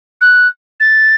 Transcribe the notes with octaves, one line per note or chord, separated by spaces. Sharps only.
F#6
A6